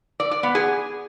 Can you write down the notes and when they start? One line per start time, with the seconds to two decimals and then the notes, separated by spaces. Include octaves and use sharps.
0.20 D5
0.31 D5
0.43 B3
0.55 G#4